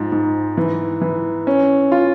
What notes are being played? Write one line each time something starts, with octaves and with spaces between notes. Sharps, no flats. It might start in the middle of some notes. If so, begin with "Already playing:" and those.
Already playing: G#2 F3
G#2
E3
E3
C#4
F4